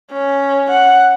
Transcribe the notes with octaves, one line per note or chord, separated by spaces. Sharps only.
C#4
F#5